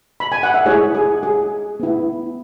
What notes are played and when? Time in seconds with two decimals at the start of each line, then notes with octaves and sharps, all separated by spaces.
0.20 B5
0.32 G#5
0.43 F#5
0.54 E5
0.66 G#3 E4 G#4 C#5
0.94 G#4
1.23 G#4
1.80 B3 E4